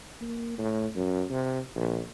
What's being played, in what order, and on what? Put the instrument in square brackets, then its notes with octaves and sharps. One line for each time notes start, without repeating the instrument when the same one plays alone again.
[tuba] A#3
A2
F#2
C3
A#1